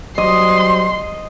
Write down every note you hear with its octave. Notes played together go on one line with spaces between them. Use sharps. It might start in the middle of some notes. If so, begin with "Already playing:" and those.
F#3 G3 C5 D#5 C6